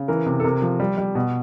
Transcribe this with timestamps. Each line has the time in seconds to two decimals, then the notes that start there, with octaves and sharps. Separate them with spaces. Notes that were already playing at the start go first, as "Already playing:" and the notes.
Already playing: C#3
0.08 E3 A#4
0.26 C3
0.40 A4
0.44 C3 A#4
0.62 F3
0.80 G3
0.98 G3
1.15 B2